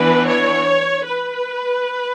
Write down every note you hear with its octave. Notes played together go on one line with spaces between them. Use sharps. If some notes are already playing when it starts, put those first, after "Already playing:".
Already playing: E3 B3 D4 B4
C#5
B4